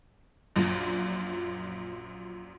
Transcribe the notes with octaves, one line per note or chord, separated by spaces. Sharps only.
A#1 F#2 A#2